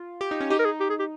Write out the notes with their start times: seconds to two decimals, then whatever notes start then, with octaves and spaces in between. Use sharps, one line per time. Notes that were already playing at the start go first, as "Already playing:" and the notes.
Already playing: F4
0.21 G4
0.31 D#4
0.40 C#4
0.50 D#4 G4
0.59 A#4
0.65 G#4
0.80 G4
0.90 G#4
0.99 G4